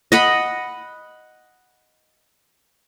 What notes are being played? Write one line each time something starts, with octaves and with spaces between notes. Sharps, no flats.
D#5 F#5 B5